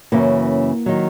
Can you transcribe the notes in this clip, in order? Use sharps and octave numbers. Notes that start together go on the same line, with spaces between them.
F#2 C#3 E3 A#3
D#3 F#3